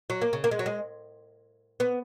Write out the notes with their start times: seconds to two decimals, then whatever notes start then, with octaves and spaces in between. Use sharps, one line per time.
0.10 F#3
0.22 A#3
0.33 C#3
0.44 A#3
0.51 G#3
0.59 F#3
0.66 G#3
1.80 B3